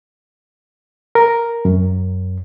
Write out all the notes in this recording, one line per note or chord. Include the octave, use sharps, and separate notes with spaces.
A#4
F#2